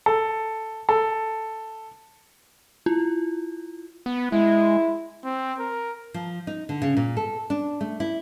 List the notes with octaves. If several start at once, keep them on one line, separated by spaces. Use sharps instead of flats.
A4
A4
E4 F4
B3
G#3 E4
C4
A#4
F3
D#4
D3
C#3
A#2
A4
D4
A3
E4